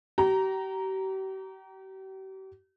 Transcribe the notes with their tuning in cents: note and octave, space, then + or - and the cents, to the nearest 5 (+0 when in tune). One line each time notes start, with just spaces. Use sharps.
G4 -40 A#5 +0